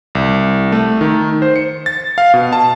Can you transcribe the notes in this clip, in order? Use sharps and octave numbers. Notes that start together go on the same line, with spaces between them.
C2
A3
D#3
C5
C#7
A6
F5
B2
A5